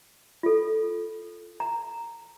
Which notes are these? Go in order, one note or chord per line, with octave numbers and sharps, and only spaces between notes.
F4 A4
A#5